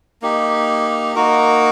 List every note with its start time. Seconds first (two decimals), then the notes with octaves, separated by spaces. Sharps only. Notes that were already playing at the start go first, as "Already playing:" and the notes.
0.22 A#3 D#4 G4
1.15 A#3 D#4 F#4 A#4